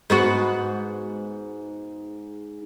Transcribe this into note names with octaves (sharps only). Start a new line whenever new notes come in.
G#2 B3 F#4